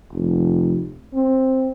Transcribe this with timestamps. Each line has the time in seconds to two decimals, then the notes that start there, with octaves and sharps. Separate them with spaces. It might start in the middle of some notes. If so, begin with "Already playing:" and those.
0.13 F1
1.14 C4